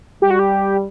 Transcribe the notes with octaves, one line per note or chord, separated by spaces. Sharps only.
G3 G4
F#4
G4